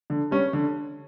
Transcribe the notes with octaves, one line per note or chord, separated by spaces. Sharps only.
D3
G3 C#4
D3